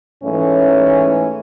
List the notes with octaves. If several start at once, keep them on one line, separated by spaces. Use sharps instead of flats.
G#2 E3 A3 C#4